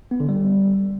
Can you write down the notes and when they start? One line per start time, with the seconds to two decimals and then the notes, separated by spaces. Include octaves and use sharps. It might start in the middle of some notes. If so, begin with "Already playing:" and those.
0.11 B3
0.20 D3
0.29 G3